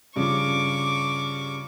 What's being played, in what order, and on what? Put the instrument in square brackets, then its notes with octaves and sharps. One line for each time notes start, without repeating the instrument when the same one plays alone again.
[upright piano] G2 C#3 F3 [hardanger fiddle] C#6 D6